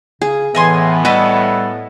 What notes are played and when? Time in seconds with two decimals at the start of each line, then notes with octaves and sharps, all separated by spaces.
0.22 C#3 G#4
0.55 A2 E3 B3 D#5 G#5 C6
1.05 G3 F#4 A4 B4 D#5 G#5